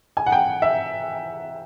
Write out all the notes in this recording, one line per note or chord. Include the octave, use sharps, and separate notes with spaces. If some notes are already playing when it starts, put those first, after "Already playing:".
G#5
F#5
G5
E5